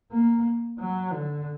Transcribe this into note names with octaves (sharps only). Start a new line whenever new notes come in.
A#3
F#3
D3